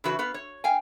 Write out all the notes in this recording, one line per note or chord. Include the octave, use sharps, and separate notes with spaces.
C#3 E3 F#4 B4
B3 B4 F5
C#5
F5 G5 G#5